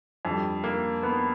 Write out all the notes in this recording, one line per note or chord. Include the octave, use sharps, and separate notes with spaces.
F2 D3 G3
A#3
B3